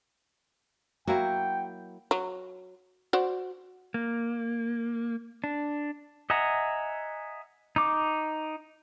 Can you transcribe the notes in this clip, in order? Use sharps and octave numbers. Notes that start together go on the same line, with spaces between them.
F#3 A#3 E4 F#4 G5
F#3
F#4 C5 D5
A#3
D4
D#5 E5 F#5 G#5 A#5
D#4 D6